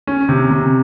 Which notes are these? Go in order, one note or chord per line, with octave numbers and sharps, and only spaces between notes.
C#4
C3
C3